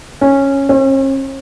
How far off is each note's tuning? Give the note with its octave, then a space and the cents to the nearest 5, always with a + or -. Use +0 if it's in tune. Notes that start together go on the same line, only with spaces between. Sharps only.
C#4 -10
C#4 -45